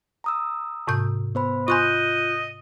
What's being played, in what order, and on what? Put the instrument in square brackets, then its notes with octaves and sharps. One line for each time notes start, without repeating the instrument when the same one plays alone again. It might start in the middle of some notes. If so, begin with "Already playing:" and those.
[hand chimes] A#5 D#6 E6
[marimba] G#2 C3 G6
[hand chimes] B3 C5 B5
[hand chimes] F4 F#6 G6 [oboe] D#5 [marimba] G#5 C6 C#6